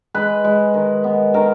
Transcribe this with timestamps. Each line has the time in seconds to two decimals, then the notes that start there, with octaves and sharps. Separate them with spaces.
0.14 G#3 B4
0.44 G#3
0.74 D#3
1.04 B3
1.34 D#3 A#4